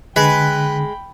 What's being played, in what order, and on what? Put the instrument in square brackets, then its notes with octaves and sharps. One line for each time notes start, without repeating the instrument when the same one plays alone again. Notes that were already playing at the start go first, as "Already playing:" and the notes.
[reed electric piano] D3 [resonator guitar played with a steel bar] G#3 [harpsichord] B4 [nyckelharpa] G5 B5